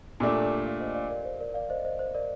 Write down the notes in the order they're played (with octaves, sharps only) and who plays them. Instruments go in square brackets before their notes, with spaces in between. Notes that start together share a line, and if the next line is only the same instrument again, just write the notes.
[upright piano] A#2 A3 D4 [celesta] G4
[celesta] A4
A#4
D5 F5
C5 D#5
D5 F5
A#4 D5
C5
A#4 D5
D5 F5
C5 D#5
C5 D#5
C5
A#4 D5